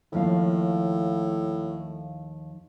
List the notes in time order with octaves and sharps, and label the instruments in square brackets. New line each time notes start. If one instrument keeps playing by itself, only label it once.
[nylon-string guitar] D#2 F3 F5 [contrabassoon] A2